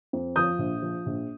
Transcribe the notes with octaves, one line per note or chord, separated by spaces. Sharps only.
F2
F3 D#6 G6
A#1
F3
A#1